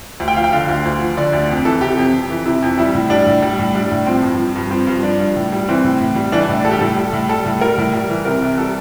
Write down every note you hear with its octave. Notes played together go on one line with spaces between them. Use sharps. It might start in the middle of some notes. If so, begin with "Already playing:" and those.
D2
G5
F3 F5
G5
D3 F5
D2
D2
F3
D3 D5
D2
F2
E3 A4
C3 G4
F2
F2
E3
C3 E4
F2
G3 E4
A2
G3 D4
A2
G3
A2
G3 D4
A2
F3 C4
G2
F3
G2
F3 C4
G2
F3 D4
G2
A2
G3
E3 C4
A2
A2
G3
E3 D4
D4
A2
D4
G3 A4
G4
A2 A4
G3
A2
G3 A4
A2
G3 A#4
A2
G3
E3
C3 A#4
C2
G3 A4